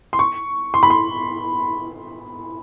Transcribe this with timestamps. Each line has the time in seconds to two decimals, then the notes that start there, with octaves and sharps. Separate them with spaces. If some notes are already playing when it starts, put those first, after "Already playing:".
0.13 C6
0.19 C#6
0.74 C6
0.83 B5
0.90 C6